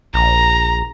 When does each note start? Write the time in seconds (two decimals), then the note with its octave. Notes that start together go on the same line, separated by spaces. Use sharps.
0.14 A#1 A#5